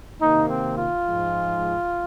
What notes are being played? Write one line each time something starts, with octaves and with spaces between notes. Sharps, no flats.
C3 D#3 A#3 D#4
C4
F4
G#2 F3 G#3